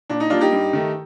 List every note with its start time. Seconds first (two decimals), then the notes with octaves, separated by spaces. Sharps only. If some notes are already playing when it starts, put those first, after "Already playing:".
0.10 A#2 D4
0.20 D#4
0.30 G3 A#3 D4 F4
0.41 D#4 G4
0.52 G2
0.73 D#3 A3